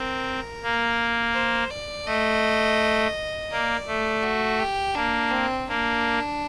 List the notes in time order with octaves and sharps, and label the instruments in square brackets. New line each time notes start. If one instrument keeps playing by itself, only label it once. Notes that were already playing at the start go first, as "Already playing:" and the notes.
Already playing: [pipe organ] C4 [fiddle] A#4
[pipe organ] A#3
[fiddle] C5
D5
[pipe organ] A3 [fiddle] D#5
[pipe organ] A#3 [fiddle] D5
[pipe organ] A3
[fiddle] F#4
G4
[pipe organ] A#3 [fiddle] D4
[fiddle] C4
[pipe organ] A#3 [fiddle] D4